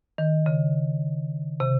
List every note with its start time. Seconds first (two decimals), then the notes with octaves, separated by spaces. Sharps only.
0.18 D#3
0.46 C#3
1.60 C3